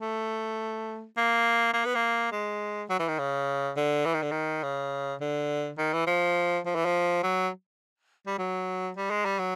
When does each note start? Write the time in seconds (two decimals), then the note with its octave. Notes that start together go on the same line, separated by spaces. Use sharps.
0.01 A3
1.17 A#3
1.74 A#3
1.85 B3
1.95 A#3
2.32 G#3
2.89 F#3
2.99 E3
3.08 D#3
3.19 C#3
3.77 D3
4.05 E3
4.14 D#3
4.22 D3
4.31 D#3
4.63 C#3
5.20 D3
5.78 D#3
5.93 E3
6.07 F3
6.65 F3
6.75 E3
6.85 F3
7.23 F#3
8.27 G3
8.38 F#3
8.96 G3
9.10 G#3
9.25 G3
9.39 F#3